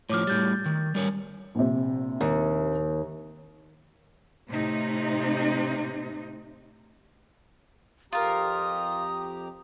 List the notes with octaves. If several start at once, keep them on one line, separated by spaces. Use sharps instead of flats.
A2 F3 C#5 D6 F6
A2 G3 G6 A6
D#3
G3 A#4 C#5
A#1 C3
D#2
A2 C3 D#4
F2 F4 G4 A#4 A#5 D#6